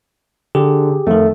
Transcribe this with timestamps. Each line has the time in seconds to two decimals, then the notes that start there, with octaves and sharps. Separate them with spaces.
0.55 D3 G4 G#4
1.07 F2 D#3 A3